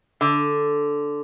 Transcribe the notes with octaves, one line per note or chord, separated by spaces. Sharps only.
D3